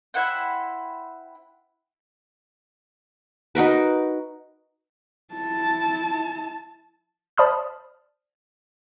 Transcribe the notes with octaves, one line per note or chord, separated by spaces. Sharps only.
E4 C5 F#5 G5
D#4 F#4 A#4 B4
E4 A5
C5 D5 A5 B5 D#6 F6